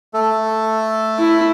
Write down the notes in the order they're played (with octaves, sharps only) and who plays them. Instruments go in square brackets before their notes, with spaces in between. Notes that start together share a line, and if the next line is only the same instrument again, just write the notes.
[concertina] A3 A4
[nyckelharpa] E4